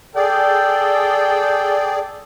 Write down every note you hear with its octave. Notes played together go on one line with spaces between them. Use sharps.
G#4 A4 D5 G5